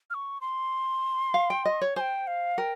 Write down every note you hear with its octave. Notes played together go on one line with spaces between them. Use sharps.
F6
C#6
C6
F5
G5
D#5
C#5
C5 G5 G#5
F5
A#4 G5